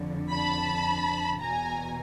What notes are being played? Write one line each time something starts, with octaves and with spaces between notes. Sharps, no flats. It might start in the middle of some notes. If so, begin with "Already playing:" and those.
Already playing: F2 D3
A5 B5
E2 B2 G#5 A#5